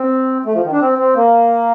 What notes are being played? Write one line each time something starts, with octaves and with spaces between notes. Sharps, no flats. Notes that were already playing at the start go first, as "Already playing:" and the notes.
Already playing: C4
A3
F3
D#3
D4
C4
C4
A#3